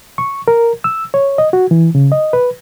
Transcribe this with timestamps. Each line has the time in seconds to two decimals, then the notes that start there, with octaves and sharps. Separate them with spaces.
0.18 C#6
0.48 A#4
0.84 E6
1.14 C#5
1.38 D#5
1.53 F#4
1.71 E3
1.95 C#3
2.12 D#5
2.33 B4